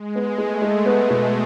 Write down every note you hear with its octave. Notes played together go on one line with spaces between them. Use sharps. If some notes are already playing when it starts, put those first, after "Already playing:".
Already playing: G#3
B3
G#3 A3
G#3
B3
B2